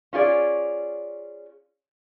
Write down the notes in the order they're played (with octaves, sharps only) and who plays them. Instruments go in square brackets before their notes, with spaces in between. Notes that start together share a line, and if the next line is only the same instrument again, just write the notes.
[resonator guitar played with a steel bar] C#4 F4 G#4 D5